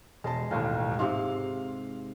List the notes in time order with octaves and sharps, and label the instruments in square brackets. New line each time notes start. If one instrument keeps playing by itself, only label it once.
[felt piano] E1 A5 [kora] G#3
[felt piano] E1 D#2 A2 [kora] F4
[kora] G#2 C3 [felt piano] F5 C6